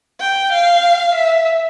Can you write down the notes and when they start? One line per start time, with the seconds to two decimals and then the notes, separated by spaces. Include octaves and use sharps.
0.20 G5
0.52 F5
1.15 E5